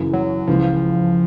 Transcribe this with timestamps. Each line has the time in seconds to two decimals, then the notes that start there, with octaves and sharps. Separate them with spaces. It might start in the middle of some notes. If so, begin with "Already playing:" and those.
Already playing: F#2 C#3 E3
0.13 F#3
0.47 C#2 C#3 E3 F3